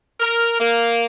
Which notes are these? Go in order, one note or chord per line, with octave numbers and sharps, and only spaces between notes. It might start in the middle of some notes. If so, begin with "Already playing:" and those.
A#4
A#3